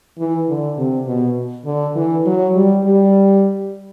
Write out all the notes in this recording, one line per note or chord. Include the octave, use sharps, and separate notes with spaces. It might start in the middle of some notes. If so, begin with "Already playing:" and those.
E3
D3
C3
B2
D3
E3
F#3
G3
G3